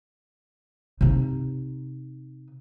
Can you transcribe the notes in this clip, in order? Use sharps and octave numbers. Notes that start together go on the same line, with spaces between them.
C3 D#4